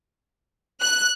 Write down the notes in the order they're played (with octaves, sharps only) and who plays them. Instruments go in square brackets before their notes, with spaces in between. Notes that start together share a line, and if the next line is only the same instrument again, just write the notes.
[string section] F#6